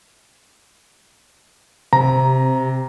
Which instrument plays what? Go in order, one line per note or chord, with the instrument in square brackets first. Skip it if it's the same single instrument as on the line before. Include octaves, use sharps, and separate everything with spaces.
[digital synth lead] C3 [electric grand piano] A#5